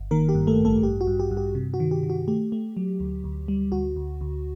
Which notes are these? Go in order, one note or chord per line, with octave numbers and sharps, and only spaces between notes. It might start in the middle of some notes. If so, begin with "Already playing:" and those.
Already playing: G1
D#3 A#3 A#4
G4
G2
A3 A4
A1
A3 A4
G2 G4
F#4
G2
G4
G2
G4
C3
F#4
D#3
G4
D#3
F#4
A3 G4
A3
F#3
D2
D2
G3
D2 F#4
D2
D2